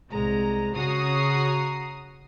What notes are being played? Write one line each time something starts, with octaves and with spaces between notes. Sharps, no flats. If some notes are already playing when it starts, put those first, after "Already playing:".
C2 G#3 A#5
C#3 F#4 A#5 D#6 C7